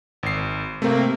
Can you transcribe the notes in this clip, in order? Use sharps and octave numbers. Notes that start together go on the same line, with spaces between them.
G#1 C7
C3 A3 A#3 C4